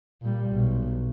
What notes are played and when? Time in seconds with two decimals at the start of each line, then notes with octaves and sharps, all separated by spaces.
0.22 A#2 G3
0.50 B1